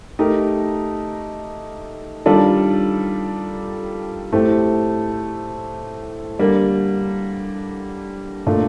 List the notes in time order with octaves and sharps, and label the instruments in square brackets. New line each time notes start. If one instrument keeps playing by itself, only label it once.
[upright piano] A3 D#4 G4 A#4
D#3 G3 D4 F4 A4
A2 A3 C4 G4
D3 G3 A#3
A#2 A3 D4